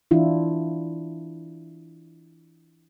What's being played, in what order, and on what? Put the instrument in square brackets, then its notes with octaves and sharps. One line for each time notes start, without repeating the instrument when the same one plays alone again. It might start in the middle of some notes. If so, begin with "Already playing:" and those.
[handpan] E3 D4 E4 F4